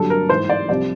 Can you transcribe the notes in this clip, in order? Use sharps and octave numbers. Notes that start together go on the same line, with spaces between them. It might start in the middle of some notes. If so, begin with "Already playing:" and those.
Already playing: G2 D3 F#3 A4
A#4
G#2 E3 C5
D5
C2 C3 F3 D5